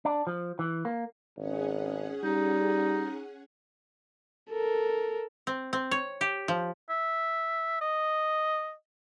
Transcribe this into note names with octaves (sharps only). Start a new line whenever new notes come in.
D4
F3
E3
A#3
G#1 C#4 G#4 F#5
G3 D#4
A4 A#4
C4
C4
C#5
G4
F3
E5
D#5